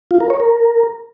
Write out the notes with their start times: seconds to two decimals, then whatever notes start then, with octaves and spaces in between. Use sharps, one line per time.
0.11 F4
0.20 A#4
0.30 C#5
0.40 A#4